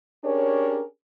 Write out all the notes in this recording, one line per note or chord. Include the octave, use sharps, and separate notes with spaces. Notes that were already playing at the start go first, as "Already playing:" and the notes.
C#4 D4 G4 G#4 A#4 C#5